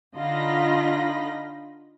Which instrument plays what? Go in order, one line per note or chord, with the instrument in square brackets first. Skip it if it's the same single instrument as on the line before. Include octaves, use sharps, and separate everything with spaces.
[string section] D3 D#4 F4 D#5 B5 A#6